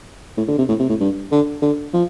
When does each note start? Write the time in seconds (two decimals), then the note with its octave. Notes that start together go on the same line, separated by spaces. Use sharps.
0.37 A2
0.48 D3
0.58 C3
0.69 A2
0.80 C3
0.89 A2
1.00 G2
1.32 D3
1.62 D3
1.94 F3